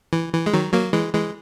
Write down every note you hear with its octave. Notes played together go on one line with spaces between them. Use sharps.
E3
E3
G#3
D#3 F#3
F#3 A#3
E3 G#3
E3 G#3